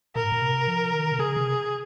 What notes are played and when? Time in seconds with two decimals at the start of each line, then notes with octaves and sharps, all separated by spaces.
0.16 A#2 A#4
0.24 G#2
0.32 A#2
0.41 C3
0.68 F3
0.93 D#3
1.12 C3
1.19 C#3 G#4
1.37 C3